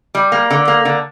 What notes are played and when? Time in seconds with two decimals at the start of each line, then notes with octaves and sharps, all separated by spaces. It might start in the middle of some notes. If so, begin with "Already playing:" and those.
0.15 G3
0.32 A#3
0.50 D3
0.68 A#3
0.85 D3